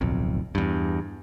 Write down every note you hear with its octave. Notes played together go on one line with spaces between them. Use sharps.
D1 B1 F2
E2 G2